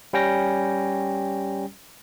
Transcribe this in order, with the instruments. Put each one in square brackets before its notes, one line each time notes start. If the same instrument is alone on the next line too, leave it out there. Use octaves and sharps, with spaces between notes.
[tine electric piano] G3 C#4 G5 A#6